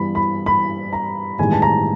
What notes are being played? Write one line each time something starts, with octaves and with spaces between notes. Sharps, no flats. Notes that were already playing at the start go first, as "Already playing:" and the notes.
Already playing: G2 E3 G3 B3 B5
B5
B5
A#5
A1 G2 D#3 G#3 B3 G#5
A5
A#5